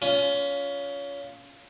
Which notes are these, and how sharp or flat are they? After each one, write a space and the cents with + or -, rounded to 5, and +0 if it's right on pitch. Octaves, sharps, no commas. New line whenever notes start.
C#4 +25 F4 +0